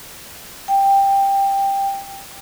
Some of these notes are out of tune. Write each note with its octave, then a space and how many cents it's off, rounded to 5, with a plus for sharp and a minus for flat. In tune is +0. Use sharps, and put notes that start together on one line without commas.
G5 +10